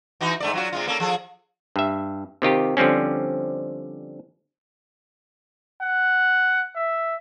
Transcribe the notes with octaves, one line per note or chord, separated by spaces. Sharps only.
E3 D#4 F#4
G#2 A3 D5
F#3 F4 F#4
C3 G#3 F4
A#3 C#4 A4
F3 G#4 A4
G2 E5
C3 D#3 F4 G4
D3 F3 G3 C4 C#4
F#5
E5